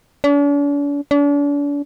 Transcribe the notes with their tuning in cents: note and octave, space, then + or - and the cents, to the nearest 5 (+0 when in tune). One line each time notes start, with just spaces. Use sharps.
D4 -45
D4 -40